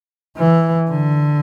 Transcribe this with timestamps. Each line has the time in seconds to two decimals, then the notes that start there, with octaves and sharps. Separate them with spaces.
0.38 E3
0.89 D3